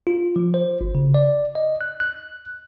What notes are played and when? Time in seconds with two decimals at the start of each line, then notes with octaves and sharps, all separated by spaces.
0.07 F4
0.36 F3
0.54 C5
0.81 G1
0.95 C#3
1.14 D5
1.55 D#5
1.81 F#6
2.00 F#6